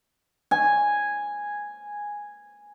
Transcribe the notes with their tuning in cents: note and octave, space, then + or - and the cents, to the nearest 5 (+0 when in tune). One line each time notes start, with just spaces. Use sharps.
G#5 -5